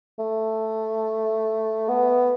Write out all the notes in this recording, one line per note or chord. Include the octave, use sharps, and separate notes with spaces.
A3
B3